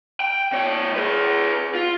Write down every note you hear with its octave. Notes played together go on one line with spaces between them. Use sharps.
G5
A#2 C#5
G#4 B4
F4